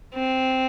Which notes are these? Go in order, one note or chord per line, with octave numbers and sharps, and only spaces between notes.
C4